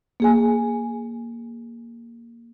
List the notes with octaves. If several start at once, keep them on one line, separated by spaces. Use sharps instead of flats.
A#3 G#4 G#5